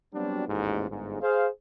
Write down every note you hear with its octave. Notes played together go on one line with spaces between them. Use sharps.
F#3 G3 B3 C4 D4 F#4
A1 D#2 G#2
G1 G#2
G#4 C5 F5